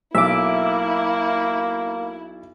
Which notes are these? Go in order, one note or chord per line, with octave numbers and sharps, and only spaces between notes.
B1 A#3 E4 E5 D6